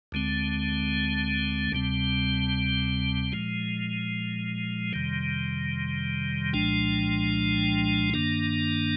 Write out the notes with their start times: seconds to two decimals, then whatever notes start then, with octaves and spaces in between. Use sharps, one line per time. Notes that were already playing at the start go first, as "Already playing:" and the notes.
0.12 D2 D3 G#3 C4
1.72 D2 C3 G3 C4
3.32 A#2 F3 G#3
4.93 F2 C3 D#3 G3
6.53 C2 A#2 F3 G#3 D4
8.14 G2 D#3 A#3 D4